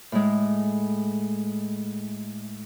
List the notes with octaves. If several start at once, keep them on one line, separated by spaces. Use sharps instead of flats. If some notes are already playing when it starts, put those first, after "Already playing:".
A2 G#3